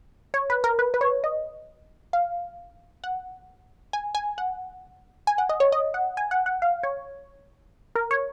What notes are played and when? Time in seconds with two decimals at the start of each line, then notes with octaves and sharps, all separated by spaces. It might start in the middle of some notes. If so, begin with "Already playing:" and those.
0.34 C#5
0.50 B4
0.64 A#4
0.79 B4
0.94 B4
1.01 C#5
1.24 D#5
2.13 F5
3.04 F#5
3.93 G#5
4.15 G#5
4.38 F#5
5.27 G#5
5.38 F#5
5.49 D#5
5.60 C#5
5.72 D#5
5.94 F#5
6.17 G#5
6.31 F#5
6.46 F#5
6.62 F5
6.83 C#5
7.95 A#4
8.11 C#5